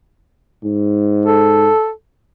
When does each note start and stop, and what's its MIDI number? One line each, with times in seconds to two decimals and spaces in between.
0.64 1.70 44
1.26 1.90 69